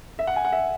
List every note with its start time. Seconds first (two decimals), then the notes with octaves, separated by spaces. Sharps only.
0.19 E5
0.27 F#5
0.36 G#5
0.45 F#5
0.52 E5